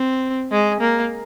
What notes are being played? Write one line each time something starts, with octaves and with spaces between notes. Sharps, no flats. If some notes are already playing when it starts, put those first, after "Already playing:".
Already playing: C4
G#3
A#3